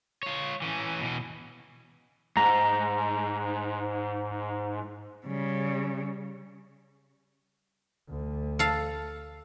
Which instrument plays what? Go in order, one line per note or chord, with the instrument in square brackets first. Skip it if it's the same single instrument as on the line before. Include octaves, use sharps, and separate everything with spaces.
[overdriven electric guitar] F4 C#5
E3 C#4
B2 E3
[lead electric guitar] G#2 [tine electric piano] A#5
[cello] C#3 G3
[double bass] D2
[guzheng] A4 F5